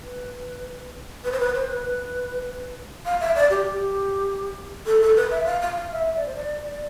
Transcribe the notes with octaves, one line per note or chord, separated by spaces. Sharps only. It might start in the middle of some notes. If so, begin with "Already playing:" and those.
B4
B4
C5
B4
C5
B4
F5
E5
D5
G4
G4
A4
A4
B4
E5
F5
F5
F5
E5
E5
D5
C5
D5
D5